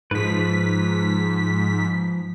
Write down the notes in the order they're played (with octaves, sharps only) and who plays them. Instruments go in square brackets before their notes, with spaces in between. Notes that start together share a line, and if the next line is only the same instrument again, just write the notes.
[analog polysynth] G#2 B6 [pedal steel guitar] F3 B4